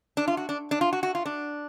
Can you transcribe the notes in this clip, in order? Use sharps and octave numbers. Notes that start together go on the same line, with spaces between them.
D4
F4
F#4
D4
D4
F4
F#4
F#4
F4
D4